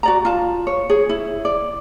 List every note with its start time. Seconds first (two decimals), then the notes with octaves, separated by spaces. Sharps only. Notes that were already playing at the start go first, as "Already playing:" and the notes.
0.03 F#4 D5 A#5
0.25 F4 A5
0.67 C#5
0.90 G#4 C#5
1.09 E4
1.45 D5